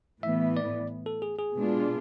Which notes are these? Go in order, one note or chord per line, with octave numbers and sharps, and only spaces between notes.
A2 E3 B3 E5
D5
A4
G#4
G#4
B2 G#3 D4 F4